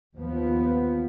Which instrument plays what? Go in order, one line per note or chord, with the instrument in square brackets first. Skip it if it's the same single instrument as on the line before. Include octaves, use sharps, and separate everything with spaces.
[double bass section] D#2 F3 B3